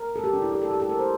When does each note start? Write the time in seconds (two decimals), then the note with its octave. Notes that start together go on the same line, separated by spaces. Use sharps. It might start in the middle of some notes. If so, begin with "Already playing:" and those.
Already playing: A#4
0.16 A4
0.24 G4
0.33 D4
0.42 E4
0.52 G4
0.62 A4
0.71 G4
0.80 A4
0.89 A#4
0.99 C5